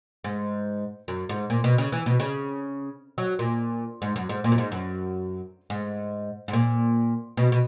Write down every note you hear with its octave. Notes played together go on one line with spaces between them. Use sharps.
G#2
F#2
G#2
A#2
B2
C#3
E3
B2
C#3
F#3
A#2
G#2
F#2
G#2
A#2
F#2
G#2
F#2
G#2
G#2
A#2
B2
B2